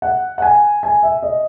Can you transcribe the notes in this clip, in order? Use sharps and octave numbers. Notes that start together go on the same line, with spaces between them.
F#5
F#5
G#5
G#5
E5
D#5